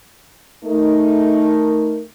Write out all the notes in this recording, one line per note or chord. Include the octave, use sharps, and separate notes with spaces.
A3 D#4 A#4